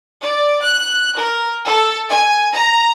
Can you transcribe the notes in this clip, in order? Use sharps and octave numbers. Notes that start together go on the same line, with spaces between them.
D5
F#6
A#4
A4
G#5
A#5